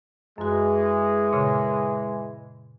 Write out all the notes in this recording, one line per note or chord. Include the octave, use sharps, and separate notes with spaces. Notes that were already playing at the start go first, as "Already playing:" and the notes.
F#2 E3 G#3 F#4
A#2 C#3